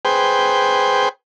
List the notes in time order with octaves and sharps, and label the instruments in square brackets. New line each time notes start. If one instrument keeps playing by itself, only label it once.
[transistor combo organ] G#4 B4 C5 G5